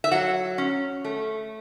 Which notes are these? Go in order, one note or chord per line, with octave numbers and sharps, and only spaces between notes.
E5
F#3 F#5
C#4
A3